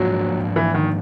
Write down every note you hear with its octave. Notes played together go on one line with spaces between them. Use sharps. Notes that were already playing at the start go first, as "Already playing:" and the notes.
Already playing: G#2 F3 F#3 A#3 D4 F4
E3
D#3